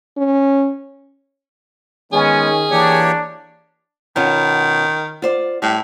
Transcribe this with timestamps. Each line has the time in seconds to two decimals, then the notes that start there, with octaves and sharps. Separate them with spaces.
0.17 C#4
2.12 D#3 G#3 B3 C#4 G#4
2.71 E3 A#3 D4 G4 C#5
4.16 B2 D#3 C#4 F4
5.22 F4 C5 D5
5.62 A2 G3